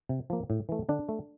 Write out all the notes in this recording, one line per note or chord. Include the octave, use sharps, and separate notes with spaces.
C3
F3 A#3
A2
E3 A3
D3 D4
A3